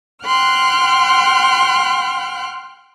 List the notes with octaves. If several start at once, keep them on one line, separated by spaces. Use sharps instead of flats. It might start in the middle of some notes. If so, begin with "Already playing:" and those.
F#5 G5 C6 F6 F#6